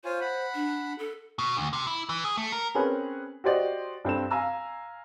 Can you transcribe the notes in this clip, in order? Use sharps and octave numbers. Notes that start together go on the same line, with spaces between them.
F4 C5 C#5 G#5
F#5 B5
D4
A4
B2
D2
C3
E4
E3
G#4
A3
A#4
C4 C#4 G#4 A#4 B4 C#5
F#4 G4 C5 D5 D#5
G2 C4 A4 E7
F5 G#5 A#5 E6